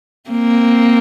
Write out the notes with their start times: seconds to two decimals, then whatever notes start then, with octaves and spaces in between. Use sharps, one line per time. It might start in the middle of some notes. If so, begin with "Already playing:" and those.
0.30 A#3 C4